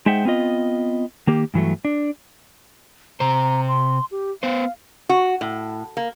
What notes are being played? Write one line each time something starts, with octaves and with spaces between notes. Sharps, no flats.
G#3 D#4 C5 E5 F#5 G5
B3 C4 F4 D#5
D#3 A#3 G4
G2 E3 F#3 A3
D4
C3 C5 A#5
C6
G4
B3 C5 F5
F#4
A2
A#3